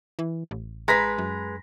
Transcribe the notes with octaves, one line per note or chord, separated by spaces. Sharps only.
E3
A1
G#3 B4 A#5 A#6 B6
F#2